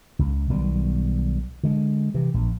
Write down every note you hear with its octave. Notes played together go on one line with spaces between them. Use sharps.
C#2
B1 B2 D#3 G3
D3 G#3
C3 E3
A#1